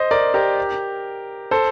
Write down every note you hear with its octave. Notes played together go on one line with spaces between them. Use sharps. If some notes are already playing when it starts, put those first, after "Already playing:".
Already playing: C5 D#5
A#4 D5
G4 A#4
A4 C5